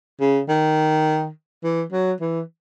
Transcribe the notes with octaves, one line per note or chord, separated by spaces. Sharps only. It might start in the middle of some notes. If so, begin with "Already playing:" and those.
C#3
D#3
E3
F#3
E3